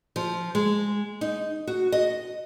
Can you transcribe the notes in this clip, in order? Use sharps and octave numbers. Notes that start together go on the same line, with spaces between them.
F3
G#3
D#4
F#4
D#5